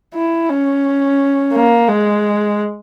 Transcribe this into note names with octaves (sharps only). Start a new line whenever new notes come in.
E4
C#4
A#3
G#3